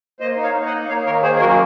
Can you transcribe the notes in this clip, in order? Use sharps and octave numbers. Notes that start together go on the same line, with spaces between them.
A#3 C5 D#5
D#4
C#5 F5
D#4
D#5 F#5
A#3
A#3 C#5 F5
D#3 A#4 C#5
A#3 G#4 C5
G#4
F#2 F#4 A#4